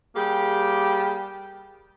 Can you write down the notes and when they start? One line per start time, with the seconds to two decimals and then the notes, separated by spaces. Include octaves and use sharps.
0.15 G3 A#3 G4 G#4